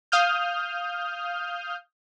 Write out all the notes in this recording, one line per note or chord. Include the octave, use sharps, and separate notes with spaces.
F5 D#6 F6 G6